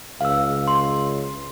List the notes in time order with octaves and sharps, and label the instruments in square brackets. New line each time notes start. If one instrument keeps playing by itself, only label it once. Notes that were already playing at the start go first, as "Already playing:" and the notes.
[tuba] C#2 [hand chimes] F5 E6
[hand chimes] C6